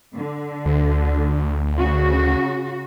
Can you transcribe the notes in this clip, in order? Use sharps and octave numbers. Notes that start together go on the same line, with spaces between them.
D3
D2
C#3 F#4